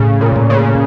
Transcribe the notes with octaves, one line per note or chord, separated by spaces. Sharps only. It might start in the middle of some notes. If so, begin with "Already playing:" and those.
Already playing: A2 C#3
A#2
A2
C#3